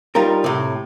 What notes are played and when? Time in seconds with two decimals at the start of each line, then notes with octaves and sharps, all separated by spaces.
0.15 G3 D#4 F4 A#4
0.44 A2 C3